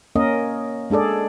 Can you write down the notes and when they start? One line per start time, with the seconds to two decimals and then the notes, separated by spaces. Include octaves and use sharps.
0.16 A#3 C#4 A#4 D#5
0.90 G#3 D4 G#4 A4 D5